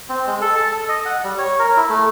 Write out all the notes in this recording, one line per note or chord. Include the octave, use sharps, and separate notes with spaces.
C4
G#3
A4
A5
A4
D#5
F#5
G3
C#5
A#4
E4
A3